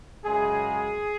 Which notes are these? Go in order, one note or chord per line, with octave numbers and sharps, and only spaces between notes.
F#2 C#3 G#3 G#4